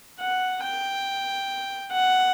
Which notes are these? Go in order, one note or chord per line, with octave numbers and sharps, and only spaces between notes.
F#5
G5
F#5